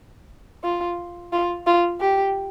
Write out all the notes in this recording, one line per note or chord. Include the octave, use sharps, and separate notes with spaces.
F4
F4
F4
G4